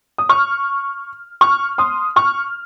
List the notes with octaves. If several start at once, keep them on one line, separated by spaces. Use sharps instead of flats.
D#6
C#6 F6
C#6 F6
C6 D#6
C#6 F6